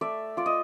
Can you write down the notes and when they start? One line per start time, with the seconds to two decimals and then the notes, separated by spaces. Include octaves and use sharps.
0.01 A3 D5 E5
0.37 F4 D5
0.46 D#5